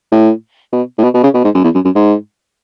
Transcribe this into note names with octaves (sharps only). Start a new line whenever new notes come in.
A2
B2
A2
B2
B2
C#3
B2
G#2
F#2
E2
F#2
F#2
G#2